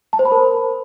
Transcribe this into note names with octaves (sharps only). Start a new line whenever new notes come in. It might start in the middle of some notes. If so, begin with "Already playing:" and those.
A5
C5
B5
A#4